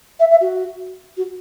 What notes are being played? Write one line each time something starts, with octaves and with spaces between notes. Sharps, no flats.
E5
E5
F#4
F#4